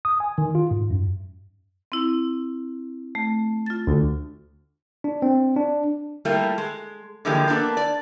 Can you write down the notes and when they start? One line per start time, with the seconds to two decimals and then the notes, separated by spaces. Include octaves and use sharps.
0.05 D#6
0.20 G#5
0.38 D#3
0.55 F4
0.71 G#2
0.90 F#2
1.92 C4 E4
3.15 A3
3.66 F4 A6
3.87 D2
5.04 D4
5.22 C4
5.56 D4
6.25 G3 A3 A#3 E4 F4
6.58 G#3
7.25 D3 E3 F3 G#3 A#3 G4
7.48 A#3 B3 D4 A4 B4
7.77 D5